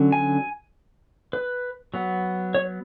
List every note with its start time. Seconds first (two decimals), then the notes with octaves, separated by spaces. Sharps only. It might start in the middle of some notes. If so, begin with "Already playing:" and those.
Already playing: D3 F#3 C#4
0.12 G#5
1.33 B4
1.94 F#3 B3
2.55 C#5